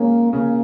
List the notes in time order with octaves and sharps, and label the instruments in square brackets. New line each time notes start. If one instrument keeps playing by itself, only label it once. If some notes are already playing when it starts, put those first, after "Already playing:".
Already playing: [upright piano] C#3 G#3 C#4 [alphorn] A#3
[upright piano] C#3 [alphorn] A#3